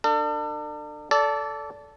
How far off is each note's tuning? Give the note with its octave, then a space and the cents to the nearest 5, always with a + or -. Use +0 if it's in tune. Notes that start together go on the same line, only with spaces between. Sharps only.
D4 +35 A4 +40
A4 +0 D5 -25